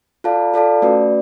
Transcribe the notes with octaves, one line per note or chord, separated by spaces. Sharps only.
F4 A4 D5 F5 A5
F4 A4 D5 F5 A5
A3 C#4 F#4 B4 D5